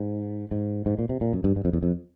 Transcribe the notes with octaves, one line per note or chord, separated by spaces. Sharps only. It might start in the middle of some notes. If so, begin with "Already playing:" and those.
Already playing: G#2
G#2
G#2
A#2
C3
A#2
F#2
G2
G2
F2
E2
F2